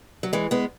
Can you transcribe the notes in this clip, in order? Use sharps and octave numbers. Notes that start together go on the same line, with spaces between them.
F#3
E3 G#3
G#3 B3